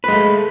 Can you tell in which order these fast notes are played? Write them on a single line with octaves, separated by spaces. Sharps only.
B4 G#3 A3